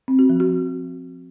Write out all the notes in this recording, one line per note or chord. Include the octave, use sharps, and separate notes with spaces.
C4
F#4
F3
F#4